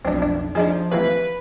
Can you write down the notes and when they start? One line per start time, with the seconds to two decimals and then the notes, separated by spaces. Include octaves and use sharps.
0.05 B1 F2 C4 D4
0.22 D4
0.55 F3 D4 D#4 G#4
0.91 C3 E3 A#3 B4